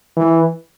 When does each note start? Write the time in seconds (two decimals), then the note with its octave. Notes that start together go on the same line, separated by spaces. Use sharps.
0.17 E3